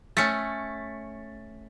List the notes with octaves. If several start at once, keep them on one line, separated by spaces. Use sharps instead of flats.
A3 C#4 A6 B6 C#7